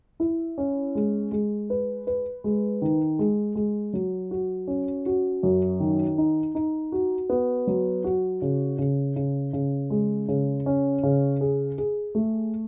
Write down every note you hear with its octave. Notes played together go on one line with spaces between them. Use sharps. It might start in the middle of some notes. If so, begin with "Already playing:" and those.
E4
C#4
G#3
G#3
B4
B4
G#3
D#3
G#3
G#3
F#3
F#4
C#4
F#4
F#2
D#3
D#4
D#4
F#4
B3
F#3
F#4
C#3
C#3
C#3
C#3
G#3
C#3
C#4
C#3
G#4
G#4
A3